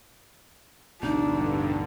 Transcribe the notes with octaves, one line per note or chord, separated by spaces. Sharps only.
A1 D2 G2 B2 D3 D4 D#4